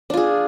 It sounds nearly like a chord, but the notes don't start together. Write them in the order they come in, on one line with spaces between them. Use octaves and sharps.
D4 F4 G#4